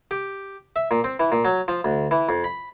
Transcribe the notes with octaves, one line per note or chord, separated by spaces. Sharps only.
G4
E5
A#2
C4
E3
A#2
F#3
F3
D2
E3
F2
B5